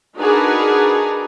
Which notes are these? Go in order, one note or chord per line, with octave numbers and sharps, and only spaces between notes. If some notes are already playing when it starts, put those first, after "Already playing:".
D4 D#4 F#4 G#4 A#4 B4